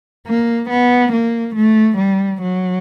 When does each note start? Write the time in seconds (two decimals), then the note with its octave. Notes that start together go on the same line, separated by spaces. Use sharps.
0.27 A#3
0.70 B3
1.12 A#3
1.55 A3
1.98 G3
2.42 F#3